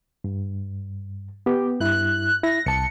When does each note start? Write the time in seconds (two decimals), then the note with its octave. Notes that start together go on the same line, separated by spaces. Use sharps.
0.24 G2
1.46 B3 G4
1.80 G2 E4 F#6
2.43 E4 A#6
2.66 C2 A5 C#7